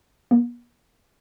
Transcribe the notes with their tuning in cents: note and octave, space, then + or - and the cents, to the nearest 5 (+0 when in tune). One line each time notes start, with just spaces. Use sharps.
B3 -45